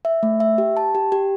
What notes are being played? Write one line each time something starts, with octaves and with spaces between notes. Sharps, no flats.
E5
A3
E5
G4
A5
G4
G4